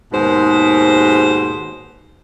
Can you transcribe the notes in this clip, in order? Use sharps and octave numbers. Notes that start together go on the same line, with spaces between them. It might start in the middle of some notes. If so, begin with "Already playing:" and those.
D#2 G#2 B2 C5